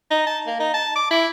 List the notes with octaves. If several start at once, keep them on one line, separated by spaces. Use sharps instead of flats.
D#4
A5
A#3
D#4
A5
D6
E4